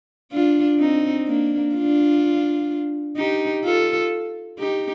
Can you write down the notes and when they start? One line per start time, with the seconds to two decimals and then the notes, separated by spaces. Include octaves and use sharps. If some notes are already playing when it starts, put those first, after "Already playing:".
0.32 D4 F4
0.79 C4 D#4
1.27 A#3 D4
1.74 D4 F4
3.17 D#4 G4
3.64 F4 A4
4.59 D#4 G4